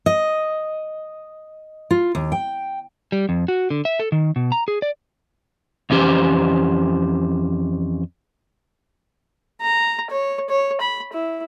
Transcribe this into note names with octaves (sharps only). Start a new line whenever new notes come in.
D#5
F4
D#2
G5
G3
F2
F#4
D3
E5
A4
D#3
B2
A#5
G#4
D5
F2 E3 C#4 G4 C5
A#5
C#5
C#5
B5
E4